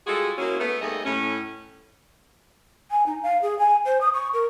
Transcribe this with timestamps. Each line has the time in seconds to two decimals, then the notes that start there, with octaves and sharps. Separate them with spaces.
0.07 G3 G#3 F4 F#4 G#4 A4
0.38 G#3 A#3 C#4 E4 F#4 G#4
0.60 A3 B3
0.82 D#2 G3 A3 G#4 D#5
1.05 A2 C#4
2.91 G#5
3.06 D#4
3.23 F5
3.42 G#4
3.59 G#5
3.85 C5
4.01 D#6
4.14 C#6
4.34 A#4